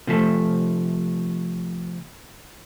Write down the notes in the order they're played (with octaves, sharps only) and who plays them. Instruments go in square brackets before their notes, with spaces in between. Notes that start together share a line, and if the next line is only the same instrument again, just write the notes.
[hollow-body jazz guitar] C3 F3 A3